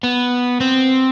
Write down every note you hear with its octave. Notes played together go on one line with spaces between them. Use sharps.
B3
C4